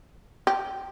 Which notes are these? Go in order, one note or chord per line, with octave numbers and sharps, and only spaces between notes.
G4